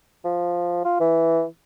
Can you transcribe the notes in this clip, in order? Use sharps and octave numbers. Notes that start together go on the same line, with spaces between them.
F3
F4
E3